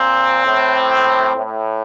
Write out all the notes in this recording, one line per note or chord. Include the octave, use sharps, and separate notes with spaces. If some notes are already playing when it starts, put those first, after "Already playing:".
Already playing: A#2 C4
A2
A2